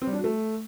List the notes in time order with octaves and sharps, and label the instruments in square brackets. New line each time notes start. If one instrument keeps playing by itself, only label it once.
[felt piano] C4
G3
D4
F#4
A3